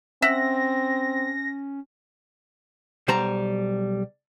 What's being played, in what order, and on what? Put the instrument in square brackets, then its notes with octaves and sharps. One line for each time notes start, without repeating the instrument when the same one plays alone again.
[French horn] C4 [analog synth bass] C#4 [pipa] E5 F#5 [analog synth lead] A#6
[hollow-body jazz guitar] B1 G3 C5 A5 A#5